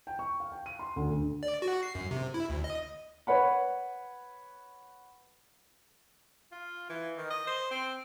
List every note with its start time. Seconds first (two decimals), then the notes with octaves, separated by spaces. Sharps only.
0.07 G5
0.19 C#6
0.40 F5
0.52 G5
0.66 D#7
0.79 C6
0.96 D2
1.10 D2
1.43 D5
1.62 F#4
1.83 C7
1.95 F#2
2.11 C3
2.34 E4
2.50 D2
2.64 D#5
3.27 B4 C#5 F#5 B5
6.52 F4
6.90 E3
7.18 D#3
7.30 D#5
7.47 C5
7.71 C4